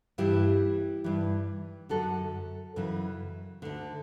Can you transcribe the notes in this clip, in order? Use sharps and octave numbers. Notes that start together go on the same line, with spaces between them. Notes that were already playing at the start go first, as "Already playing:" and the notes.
G2 E3 E4 G4
G2 E3
F#2 D3 F#4 A4
F#2 C#3 E3
D2 D3